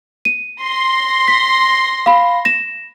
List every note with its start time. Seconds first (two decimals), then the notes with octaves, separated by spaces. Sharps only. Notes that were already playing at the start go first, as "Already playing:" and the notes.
0.25 D#7
0.60 C6 A#6
1.28 B6
2.06 F5 B5
2.45 A#6 E7